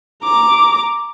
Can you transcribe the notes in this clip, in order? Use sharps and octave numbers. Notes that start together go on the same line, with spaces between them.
A#5 D6